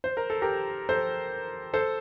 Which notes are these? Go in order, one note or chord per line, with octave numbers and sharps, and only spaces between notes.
C5
A#4
A4
G4 A#4
A4 C5
A4 C5